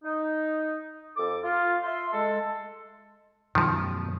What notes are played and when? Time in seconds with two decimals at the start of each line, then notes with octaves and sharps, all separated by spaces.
0.04 D#4
1.17 F2 A4 D6
1.43 F4
1.82 E5 C6
2.12 G#3 A4
3.55 F#2 B2 D#3 F3 F#3